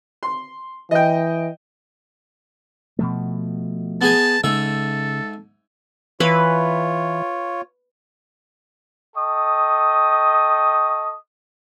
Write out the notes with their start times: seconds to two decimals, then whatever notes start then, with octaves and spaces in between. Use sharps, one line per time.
0.23 C6
0.91 E3 D#5 G5
2.99 B2 F3 A3
4.01 B3 G#4 G#5 A5
4.44 G#2 C#3 A4 E5
6.20 E3 F4 B4 C#5
9.16 A4 D#5 G5 C#6 D#6